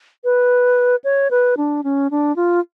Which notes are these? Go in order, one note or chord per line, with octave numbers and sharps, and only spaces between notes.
B4
C#5
B4
D4
C#4
D4
F4